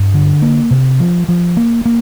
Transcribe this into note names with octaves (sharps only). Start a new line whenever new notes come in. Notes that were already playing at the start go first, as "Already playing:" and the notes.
Already playing: G2
D3
A#3
C3
F3
F3
A#3
A#3